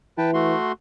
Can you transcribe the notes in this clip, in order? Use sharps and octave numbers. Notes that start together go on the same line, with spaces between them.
E3 B4 G5 A5
A3 F#4 C6